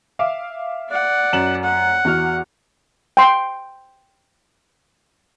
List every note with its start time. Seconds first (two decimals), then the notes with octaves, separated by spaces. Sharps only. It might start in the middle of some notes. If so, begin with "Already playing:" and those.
0.19 E5 F5 D6
0.90 D5 F#5
1.33 F#2 E7 F#7
1.64 F#5
2.05 E2 F#4 F6
3.17 G5 C6